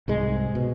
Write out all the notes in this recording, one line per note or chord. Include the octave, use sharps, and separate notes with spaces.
C2 G#2 G#3
B2